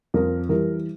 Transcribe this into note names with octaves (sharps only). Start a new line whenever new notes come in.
F2 A#4
E3 G3 A#4